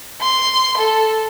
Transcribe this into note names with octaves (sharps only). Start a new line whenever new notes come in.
C6
A4